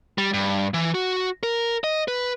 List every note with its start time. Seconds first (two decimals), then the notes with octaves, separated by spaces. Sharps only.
0.18 G3
0.34 G2
0.74 E3
0.94 F#4
1.43 A#4
1.84 D#5
2.08 B4